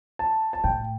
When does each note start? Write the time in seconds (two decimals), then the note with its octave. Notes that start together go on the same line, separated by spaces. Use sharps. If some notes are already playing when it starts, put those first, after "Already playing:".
0.19 A5
0.53 A5
0.64 A2 G5